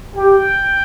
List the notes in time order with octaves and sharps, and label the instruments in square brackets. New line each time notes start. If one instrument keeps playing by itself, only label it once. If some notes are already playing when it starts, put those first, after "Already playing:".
[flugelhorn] G4 [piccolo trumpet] G5